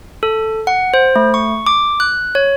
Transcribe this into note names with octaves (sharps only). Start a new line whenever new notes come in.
A4
F#5
C5
A3
C#6
D6
F#6
C#5